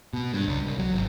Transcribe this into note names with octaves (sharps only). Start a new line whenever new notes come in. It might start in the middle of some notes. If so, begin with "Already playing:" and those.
B2
G2
C#2
C2
F#3
G#1